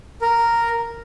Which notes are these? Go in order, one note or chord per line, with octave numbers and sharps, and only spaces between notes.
A#4